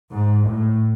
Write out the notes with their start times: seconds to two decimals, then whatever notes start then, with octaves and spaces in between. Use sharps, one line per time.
0.11 G#2
0.49 A2